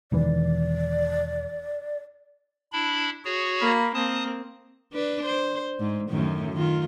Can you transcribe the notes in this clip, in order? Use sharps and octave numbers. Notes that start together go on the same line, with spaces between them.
E1 D#3 E3 D5
D4 E4 B5
F#4 G#4 C#5
A#3 B5
A#3 C4 A5 D#6
D4 B4
C5
G#2
F#2 A2 D#3
D#3 F4